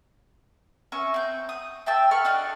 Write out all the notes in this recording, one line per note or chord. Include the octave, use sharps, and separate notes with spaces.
C#4 A#4 E5 C#6
C4 G6
D#6
E5 G5 A5 E6
A4 B5 C#6 F6
D4 D#4 F#4